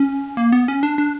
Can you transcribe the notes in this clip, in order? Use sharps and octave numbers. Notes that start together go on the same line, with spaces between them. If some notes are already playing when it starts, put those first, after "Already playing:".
Already playing: C#4
A#3
B3
C#4
D4
D4